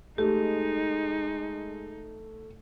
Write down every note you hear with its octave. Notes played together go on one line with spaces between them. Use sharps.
G#3 A3 D#4 G4